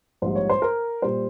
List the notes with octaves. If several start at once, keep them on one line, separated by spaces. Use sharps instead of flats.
A#1 G#2 G3 C5
C#5
C5
A#4
A#2 G3 C5